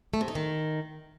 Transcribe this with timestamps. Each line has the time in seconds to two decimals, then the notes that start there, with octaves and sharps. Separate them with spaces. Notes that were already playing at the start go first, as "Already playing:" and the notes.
0.14 A3
0.21 C3
0.28 D#4
0.35 D#3